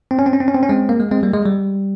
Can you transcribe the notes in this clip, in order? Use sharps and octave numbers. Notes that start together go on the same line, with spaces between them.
C4
C#4
C4
C#4
C4
C#4
C4
C#4
G#3 C4
A#3
G#3
G#3 C4
G3 A#3
G#3
G3